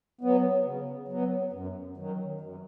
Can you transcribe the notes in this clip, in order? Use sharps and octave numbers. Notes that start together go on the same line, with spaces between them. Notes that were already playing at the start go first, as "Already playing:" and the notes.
F#3 B3
C#3
F#3 B3
F#2
D#3 F#3
F#2